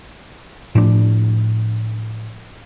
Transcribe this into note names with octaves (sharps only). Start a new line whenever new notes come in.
A2 F3 D4